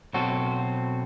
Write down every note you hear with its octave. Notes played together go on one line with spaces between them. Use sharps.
B2 F#3 C4 F#4 A4